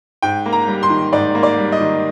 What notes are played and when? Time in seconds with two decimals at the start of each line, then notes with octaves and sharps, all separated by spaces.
0.22 G#2 G5
0.46 A#3
0.52 A#5
0.68 G3
0.83 C6
0.90 D#3
1.13 G#2 D5
1.35 A#3
1.43 D5
1.58 G3
1.72 D#5
1.80 D#3